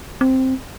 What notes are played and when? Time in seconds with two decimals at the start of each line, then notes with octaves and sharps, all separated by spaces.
0.21 C4